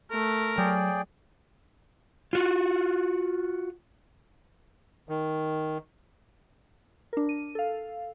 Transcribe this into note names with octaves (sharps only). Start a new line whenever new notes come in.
A3 A#4
F#3 G#4 D5 G5
F4 F#4
D#3
D4 A#4
D#7
A4 F5